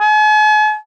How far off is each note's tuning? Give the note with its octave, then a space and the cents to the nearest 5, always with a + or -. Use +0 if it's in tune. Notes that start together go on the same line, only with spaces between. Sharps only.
G#5 +45